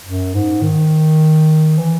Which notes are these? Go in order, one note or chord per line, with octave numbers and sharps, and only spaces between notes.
F#2
G#2
D#3
E3